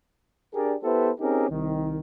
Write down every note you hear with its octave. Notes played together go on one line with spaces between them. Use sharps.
D4 G4 G#4 A#4 D5
B3 E4 G4 A4 B4 C5
C4 C#4 D#4 G4 G#4 A#4
C2 D#3